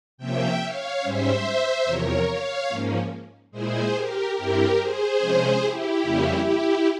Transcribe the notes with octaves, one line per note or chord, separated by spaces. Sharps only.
C3 F3 A#3 C#4 E5 G5
C#5 F5
G#2 G3 C#4 C5 E5
E2 C3 F3 A#4 C#5
C#5 F5
G#2 F3 A#3 C#4
A#2 G#3 E4 G#4 C5
G4 A#4
G2 G3 C4 E4 G4 A#4
G#4 C5
C3 F3 G#3 C#4
E4 G4
F2 C#3 G3 A#3 C#4
E4 G4